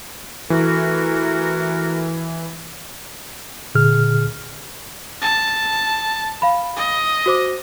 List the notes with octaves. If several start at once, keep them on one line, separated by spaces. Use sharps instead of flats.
E3 A3 F#4 A#4
A#2 D3 G#4 F6
A5
F5 B5
D#5
F#4 C5 D6